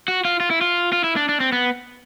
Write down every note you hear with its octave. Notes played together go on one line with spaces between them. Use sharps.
F#4
F4
F4
E4
F4
F4
E4
D4
D4
C4
B3